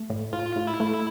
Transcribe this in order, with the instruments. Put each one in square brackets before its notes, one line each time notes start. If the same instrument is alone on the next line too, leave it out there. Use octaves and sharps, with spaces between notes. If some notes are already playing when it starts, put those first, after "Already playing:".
Already playing: [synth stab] A3
A2
[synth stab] A2 [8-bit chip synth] F4
[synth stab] A2
[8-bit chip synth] E4
[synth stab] A3